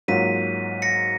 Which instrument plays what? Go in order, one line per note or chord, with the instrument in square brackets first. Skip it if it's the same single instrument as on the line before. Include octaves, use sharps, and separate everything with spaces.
[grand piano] G#2 F#3 A#3 F4 [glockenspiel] B6 D#7
[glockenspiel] A#6 C#7